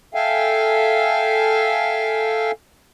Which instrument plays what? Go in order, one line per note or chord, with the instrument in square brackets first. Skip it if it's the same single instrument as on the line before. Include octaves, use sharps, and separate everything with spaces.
[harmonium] A4 E5 F5 G5 G#5